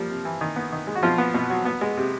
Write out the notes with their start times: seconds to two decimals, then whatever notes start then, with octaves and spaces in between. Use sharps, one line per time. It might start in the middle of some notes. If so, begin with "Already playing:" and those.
Already playing: F3 G3 A#3
0.10 C3
0.25 E3
0.41 D#3
0.56 B3
0.72 D#3
0.87 G#3
0.95 F#4
1.03 B2 F3 F4
1.18 B3
1.34 B2
1.50 F#3
1.65 B3
1.81 G#3
1.97 C3